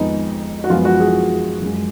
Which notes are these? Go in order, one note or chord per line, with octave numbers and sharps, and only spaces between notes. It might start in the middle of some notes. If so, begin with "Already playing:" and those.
Already playing: F2 D#3 G#3 B3 D#4
F#4
F#2 F3 G#3 B3 F4
F#4
G#4
F#2 F3 G#3